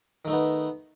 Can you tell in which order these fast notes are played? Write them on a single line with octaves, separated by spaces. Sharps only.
D#3 A3 D#4 B3